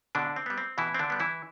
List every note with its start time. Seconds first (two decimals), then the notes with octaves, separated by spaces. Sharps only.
0.15 B2 D3 D4
0.36 C4
0.46 G3 B3
0.58 C4
0.78 B2 E3 E4
0.94 C4
0.99 D3 D4
1.10 G3 B3
1.20 E3 E4